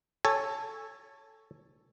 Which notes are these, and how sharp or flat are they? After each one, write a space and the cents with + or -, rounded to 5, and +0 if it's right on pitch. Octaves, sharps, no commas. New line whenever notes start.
A4 +0 C#5 +0 G#5 -15